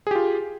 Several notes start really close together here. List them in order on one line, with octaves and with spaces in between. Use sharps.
G#4 G4 F4